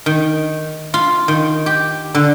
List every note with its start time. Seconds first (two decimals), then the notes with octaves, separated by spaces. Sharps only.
0.06 D#3
0.94 F4
1.28 D#3
1.66 G4
2.15 D3